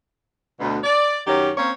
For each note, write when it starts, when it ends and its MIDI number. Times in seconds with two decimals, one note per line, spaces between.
0.60 0.78 38
0.60 0.78 47
0.84 1.20 74
1.27 1.50 42
1.27 1.50 51
1.27 1.50 61
1.27 1.50 67
1.57 1.71 58
1.57 1.71 60
1.57 1.71 61
1.57 1.71 73